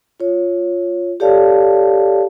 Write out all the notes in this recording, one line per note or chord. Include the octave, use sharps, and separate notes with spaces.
F4 C#5
G4 A4 C#5 D5 F5 A5